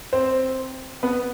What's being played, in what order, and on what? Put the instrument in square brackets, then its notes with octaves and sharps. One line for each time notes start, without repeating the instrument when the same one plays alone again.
[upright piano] C4 C5
B3 B4